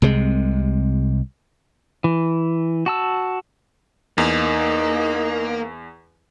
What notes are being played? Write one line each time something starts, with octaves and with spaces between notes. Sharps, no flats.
C2 C3 G#3
E3
F#4 A5 E6
E2 A#3 D#4